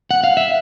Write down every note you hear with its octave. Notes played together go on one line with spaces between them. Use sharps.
F#5
F5
E5